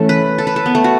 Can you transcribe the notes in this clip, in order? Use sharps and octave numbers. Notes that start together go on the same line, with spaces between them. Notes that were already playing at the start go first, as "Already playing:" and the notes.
Already playing: E3 A3 C#4 A4
B4
A4
B4
A4
B3
A3
F#4